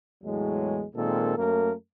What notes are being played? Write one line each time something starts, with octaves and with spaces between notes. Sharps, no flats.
E2 A2 F#3 G#3
A#2 D#3 G#3 C4 A4
F#2 A3 A#3 A#4